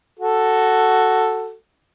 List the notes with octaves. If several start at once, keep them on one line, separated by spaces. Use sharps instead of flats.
F#4 A4